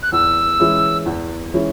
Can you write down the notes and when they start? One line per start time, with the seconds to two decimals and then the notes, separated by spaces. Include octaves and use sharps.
0.03 F#6
0.12 E2 E6
0.59 E3 G#3 C#4 E4
1.06 E2
1.54 E3 G#3 C#4 E4